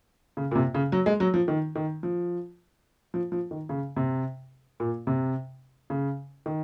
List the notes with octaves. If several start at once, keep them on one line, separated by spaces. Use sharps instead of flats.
C#3
A#2
C3
C#3
F#3
G#3
F#3
F3
D#3
D#3
F3
F3
F3
D#3
C#3
C3
A#2
C3
C#3
D#3